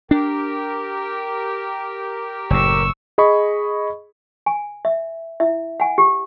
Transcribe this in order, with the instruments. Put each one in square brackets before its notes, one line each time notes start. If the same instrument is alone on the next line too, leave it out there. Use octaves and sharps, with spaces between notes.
[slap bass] D4 [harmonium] G4 A#4 G5
[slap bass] F#1 A2 [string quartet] C#6 E6
[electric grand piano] G#4 D#5 B5 C#6
[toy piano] G#5
E5
E4 E5
F#5 G#5
G4